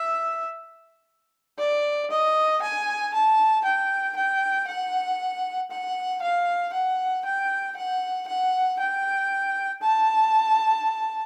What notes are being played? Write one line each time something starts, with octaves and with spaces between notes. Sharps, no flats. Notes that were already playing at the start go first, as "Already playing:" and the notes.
Already playing: E5
D5
D#5
G#5
A5
G5
G5
F#5
F#5
F5
F#5
G5
F#5
F#5
G5
A5